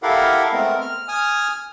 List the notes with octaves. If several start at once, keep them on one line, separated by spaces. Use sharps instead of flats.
E4 G4 A4 A#4 F5 F#5
G#3 A3 B3 C4 A#4
F6
G#5 D#6 F6